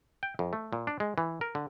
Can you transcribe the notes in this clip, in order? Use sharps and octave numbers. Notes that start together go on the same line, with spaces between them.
G5
F2
A3
A#2
D4
G#3
E3
A#4
D3